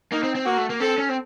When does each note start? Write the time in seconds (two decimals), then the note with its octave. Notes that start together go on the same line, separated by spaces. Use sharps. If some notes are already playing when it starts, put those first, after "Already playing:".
0.12 A#3 D#4
0.23 C4
0.35 C4
0.46 A#3 F#4
0.57 A3
0.70 A#3
0.80 C4 A4
0.98 C#4
1.09 C4